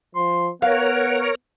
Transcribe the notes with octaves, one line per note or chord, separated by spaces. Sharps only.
F3 C6
B3 A#4 C#5 F5 F#5